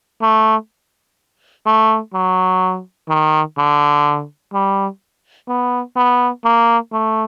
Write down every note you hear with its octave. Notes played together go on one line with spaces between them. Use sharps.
A3
A3
F#3
D#3
D3
G3
B3
B3
A#3
A3